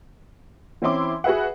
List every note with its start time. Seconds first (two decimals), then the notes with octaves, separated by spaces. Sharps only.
0.82 E3 C4 C#4 E4 C6 D6
1.24 F#4 G#4 B4 E5 F#5